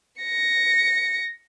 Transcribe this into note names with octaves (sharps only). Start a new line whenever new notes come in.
A#6 C#7